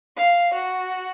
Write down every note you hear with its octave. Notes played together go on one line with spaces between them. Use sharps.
F5
F#4